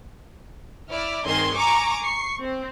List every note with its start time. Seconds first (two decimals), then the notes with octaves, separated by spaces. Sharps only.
0.91 E4 D5 F6
1.26 G2 D#3 C4 G#4 C6 G#6
1.56 G#5 A#5 C#6 D6 E6
2.01 C#6 C7
2.40 C4